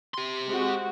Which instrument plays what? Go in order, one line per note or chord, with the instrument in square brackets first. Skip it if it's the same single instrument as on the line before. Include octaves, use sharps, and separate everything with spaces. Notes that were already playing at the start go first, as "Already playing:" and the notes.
[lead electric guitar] G4 C6
[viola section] G#3 C4 F#4